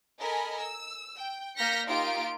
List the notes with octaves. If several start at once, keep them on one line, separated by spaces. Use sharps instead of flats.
A4 A#4 D#5 G#5 B5
E6
G5
A#3 F6 G6 A#6 B6 C#7
A#3 D#4 F4 G4 C6 D7